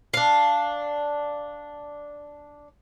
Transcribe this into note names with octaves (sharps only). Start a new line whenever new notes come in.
D4 F5